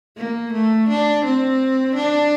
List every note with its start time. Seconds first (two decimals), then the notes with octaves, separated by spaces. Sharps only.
0.17 A#3
0.53 A3
0.89 D4
1.25 C4
1.96 D4